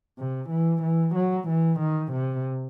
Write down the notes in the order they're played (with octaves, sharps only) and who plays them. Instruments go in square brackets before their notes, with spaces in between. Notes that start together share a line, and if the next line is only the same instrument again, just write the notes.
[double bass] C3
E3
E3
F#3
E3
D#3
C3